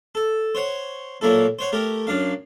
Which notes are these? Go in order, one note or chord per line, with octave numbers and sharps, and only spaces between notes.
A4
C5 C#5 F#5
A#2 F#3 A#3 E4 A4
C5 C#5 F#5
A3 G4 A#4
F#2 D4 F5